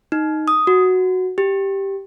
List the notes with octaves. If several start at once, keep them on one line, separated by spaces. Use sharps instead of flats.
D#4
D#6
F#4
G4